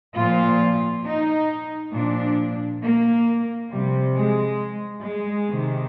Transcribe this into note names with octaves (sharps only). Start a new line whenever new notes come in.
A#2 F3 F4
D#4
A#2 F3 D4
A#3
C3 F3 G3
G#3
G#3
C3 D#3